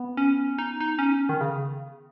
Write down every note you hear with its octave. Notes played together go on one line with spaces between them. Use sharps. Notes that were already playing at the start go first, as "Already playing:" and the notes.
Already playing: B3
C#4
D#4
D#4
C#4
D#3
C#3